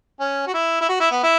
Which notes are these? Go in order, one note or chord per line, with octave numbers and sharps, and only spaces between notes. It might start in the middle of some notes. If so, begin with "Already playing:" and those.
C#4
F#4
E4
E4
F#4
E4
B3
E4